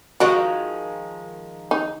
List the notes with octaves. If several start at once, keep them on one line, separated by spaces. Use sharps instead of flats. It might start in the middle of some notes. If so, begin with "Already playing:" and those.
D#3 F3 G#3 F#4 D#5
D#4